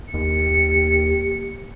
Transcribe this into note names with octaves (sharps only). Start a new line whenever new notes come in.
D#2 A#3 G4 C#7